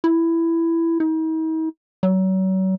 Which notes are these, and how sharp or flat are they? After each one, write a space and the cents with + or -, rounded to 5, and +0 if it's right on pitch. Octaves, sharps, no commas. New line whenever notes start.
E4 +10
D#4 +45
F#3 +35